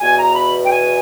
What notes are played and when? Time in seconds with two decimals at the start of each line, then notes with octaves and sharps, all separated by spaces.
0.01 E2 B2 G#5
0.19 A#5
0.36 B5
0.66 G5
0.71 G#5